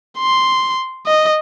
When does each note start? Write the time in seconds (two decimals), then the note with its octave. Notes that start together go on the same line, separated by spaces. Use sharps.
0.19 C6
1.07 D#5